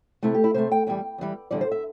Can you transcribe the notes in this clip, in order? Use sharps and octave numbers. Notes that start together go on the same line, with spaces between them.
C3 A3 E4
G4
E4
C3 A3 C5
G5
E2 E3 G3 G5
E2 E3 G3
E2 D3 G3 D5
C5
E5